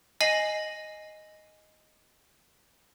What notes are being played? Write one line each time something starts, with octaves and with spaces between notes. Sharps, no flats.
D#5 G#5 A#6 C7 D#7 F#7